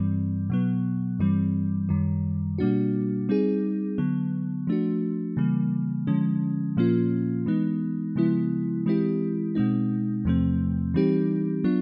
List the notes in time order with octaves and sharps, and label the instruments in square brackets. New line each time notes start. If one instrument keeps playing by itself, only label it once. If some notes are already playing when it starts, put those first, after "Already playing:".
Already playing: [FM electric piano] G2 E3 G3 C4
B2 F#3 B3
G2 E3 G3 C4
F#2 D#3 G3
B2 G3 A#3 D4 F#4
G3 C4 D#4 G#4
D3 F#3 B3
F3 A3 D4 F#4
C#3 E3 G3 A#3
D3 F3 G#3 C#4
A#2 F3 A#3 C#4 F4
E3 G#3 B3 D#4
C#3 F3 G#3 B3 E4
E3 G#3 C4 E4 G4
B2 G#3 C4 D#4
E2 C3 F3 A3 C4
E3 G3 C4 D#4 G4
F#3 B3 D4 F4